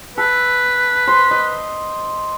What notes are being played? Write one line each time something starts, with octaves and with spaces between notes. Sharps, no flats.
A4 B4
C5
D#5